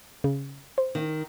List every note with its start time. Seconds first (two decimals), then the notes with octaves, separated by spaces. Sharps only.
0.24 C#3
0.78 C5
0.95 D#3